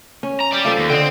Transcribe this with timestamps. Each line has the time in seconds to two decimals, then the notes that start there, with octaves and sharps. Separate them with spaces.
0.23 C#4
0.40 A#5
0.53 G3 D5
0.65 F4 A4 C5
0.78 D#2
0.90 D3 C5 D#5 G5